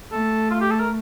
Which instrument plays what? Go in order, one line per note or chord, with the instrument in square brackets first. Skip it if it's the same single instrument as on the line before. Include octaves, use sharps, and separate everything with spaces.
[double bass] A3 [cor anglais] A4
[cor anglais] F4
G4
A4
A#4